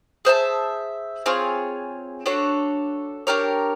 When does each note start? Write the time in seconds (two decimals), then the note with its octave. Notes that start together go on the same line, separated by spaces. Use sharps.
0.25 G#4 C5 E5 A5
1.26 C4 F4 G#4 C#5
2.26 D4 F#4 A4 C#5
3.27 D4 G4 A#4 C#5